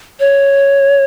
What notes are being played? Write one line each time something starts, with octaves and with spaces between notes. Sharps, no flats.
C#5